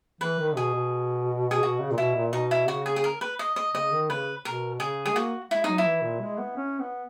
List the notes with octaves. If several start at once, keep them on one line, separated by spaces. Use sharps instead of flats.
E3 B4
D#3
B2 G#4
B2
G#4
B2 F#4
C#3
A#2
B2 E4
A#2
B2 D#4
E4
C#3 F#4
G#4
G#4
A#4
B4
D#5
D#5
C#3 D#5
D#3
C#3 B4
B2 A#4
C#3 G#4
G#3 G#4
A#3 F#4
G#3 E4
F#3 D#4
E4
E3
A#2
G#3
B3
C#4
B3